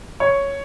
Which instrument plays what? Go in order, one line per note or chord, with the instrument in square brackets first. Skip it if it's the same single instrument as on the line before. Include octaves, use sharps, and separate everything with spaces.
[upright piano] C#5